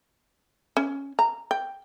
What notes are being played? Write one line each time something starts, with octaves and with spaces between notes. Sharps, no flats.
C#4
A#5
G5